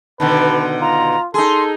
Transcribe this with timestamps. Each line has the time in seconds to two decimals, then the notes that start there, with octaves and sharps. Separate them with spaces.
0.20 B2 D3 D#3 B4 A5
0.81 F4 A#5
1.34 D#4 G#4 A4 C6